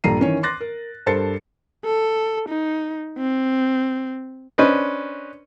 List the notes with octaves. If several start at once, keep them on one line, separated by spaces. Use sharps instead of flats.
A#1 G2 A4 A#5 C7 D#7
D#3 E3 C#4 C#5
C6 D6 F#6 A6 A#6
A#4
G2 A4 A#4 C5 A6 C#7
A4
D#4
C4
C#4 D4 B4 C5 D#5